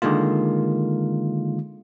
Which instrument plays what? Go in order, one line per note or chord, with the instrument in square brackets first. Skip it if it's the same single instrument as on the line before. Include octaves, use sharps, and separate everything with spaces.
[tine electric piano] D3 D#3 G#3 A#3 F4